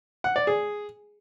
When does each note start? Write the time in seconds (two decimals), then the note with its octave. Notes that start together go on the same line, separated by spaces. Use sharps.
0.24 F#5
0.36 D5
0.47 G#4